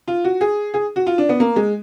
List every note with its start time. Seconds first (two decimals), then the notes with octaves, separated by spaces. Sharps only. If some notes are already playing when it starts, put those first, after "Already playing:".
0.08 F4
0.24 F#4
0.41 G#4
0.74 G#4
0.96 F#4
1.07 F4
1.18 D4
1.29 B3
1.40 A#3
1.56 G#3